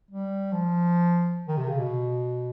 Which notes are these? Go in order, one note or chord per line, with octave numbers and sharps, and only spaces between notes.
G3
F3
D#3
C3
C#3
B2